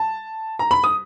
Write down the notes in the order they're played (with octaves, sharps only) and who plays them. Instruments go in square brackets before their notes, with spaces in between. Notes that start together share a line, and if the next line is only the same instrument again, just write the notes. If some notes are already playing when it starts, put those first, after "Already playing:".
Already playing: [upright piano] A5
A#5
B5
D#6